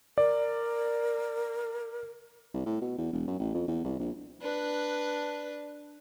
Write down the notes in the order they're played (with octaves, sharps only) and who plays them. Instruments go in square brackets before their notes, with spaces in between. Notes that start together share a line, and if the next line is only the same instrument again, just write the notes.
[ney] A#4 [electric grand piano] D5
[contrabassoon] C2
A2
B2
E2
E1
F#2
A1
F2
E2
C2
A#1
[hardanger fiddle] D4 B4